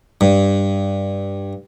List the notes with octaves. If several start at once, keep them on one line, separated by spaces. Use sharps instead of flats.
G2